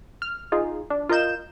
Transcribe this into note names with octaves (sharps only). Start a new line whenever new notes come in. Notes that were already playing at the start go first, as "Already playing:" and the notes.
F6
D#4 F4 G#4
D4
F4 A#4 D#5 G6 E7